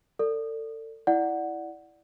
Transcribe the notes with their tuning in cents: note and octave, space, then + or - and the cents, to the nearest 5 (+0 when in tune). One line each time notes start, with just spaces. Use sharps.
A4 +35 D5 -10
E4 +0 D5 +0 F#5 +0